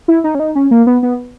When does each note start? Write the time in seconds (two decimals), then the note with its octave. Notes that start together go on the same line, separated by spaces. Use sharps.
0.08 E4
0.24 D#4
0.35 C#4
0.40 D#4
0.55 C#4
0.71 A#3
0.87 B3
1.03 B3